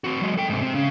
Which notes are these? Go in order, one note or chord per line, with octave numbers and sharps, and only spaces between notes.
C4 F#4
F#3 G#3
A4 G5
G#2 C3
C3
C#3